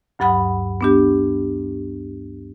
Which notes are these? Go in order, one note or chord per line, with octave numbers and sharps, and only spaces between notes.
D2 G2 F#3 F#5 B5 D#6
B3 D4 G4